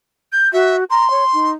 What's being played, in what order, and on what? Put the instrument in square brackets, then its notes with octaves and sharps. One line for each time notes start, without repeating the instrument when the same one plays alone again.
[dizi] G6
[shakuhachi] F#4 [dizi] E5
[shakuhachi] A#5 [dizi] C6
[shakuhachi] C#5
D#4